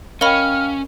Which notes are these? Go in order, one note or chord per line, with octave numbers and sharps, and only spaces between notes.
C#4 A#4 D#5 F5 G5 B5 F6